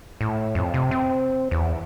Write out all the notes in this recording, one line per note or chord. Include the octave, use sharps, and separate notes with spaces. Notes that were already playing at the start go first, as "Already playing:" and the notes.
A2
F2
C3
C4
E2